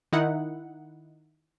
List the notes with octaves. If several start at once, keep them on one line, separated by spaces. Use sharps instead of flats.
D#3 D#4 E4 F#5